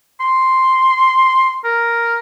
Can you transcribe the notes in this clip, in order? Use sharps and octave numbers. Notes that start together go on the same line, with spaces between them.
C6
A#4